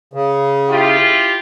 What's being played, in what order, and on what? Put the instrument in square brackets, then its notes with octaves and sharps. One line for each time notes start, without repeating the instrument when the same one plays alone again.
[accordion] C#3
[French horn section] E4 F4 G4